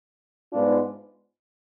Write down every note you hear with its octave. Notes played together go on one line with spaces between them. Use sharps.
G#2 G#3 B3 D4 F4